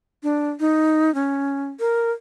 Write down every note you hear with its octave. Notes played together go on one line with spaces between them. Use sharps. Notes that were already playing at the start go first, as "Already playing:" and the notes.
D4
D#4
C#4
A#4